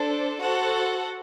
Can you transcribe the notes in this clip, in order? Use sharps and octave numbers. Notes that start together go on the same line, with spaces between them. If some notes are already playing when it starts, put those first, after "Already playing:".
Already playing: D4 A4 C5
F#4 A4 C5 F#5